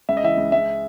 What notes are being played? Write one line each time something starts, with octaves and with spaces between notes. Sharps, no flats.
C#2 E5
D#5
E3 E5
C#2
G#3 E5